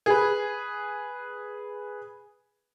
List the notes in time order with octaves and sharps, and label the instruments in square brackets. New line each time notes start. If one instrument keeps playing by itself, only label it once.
[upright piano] G#4 B4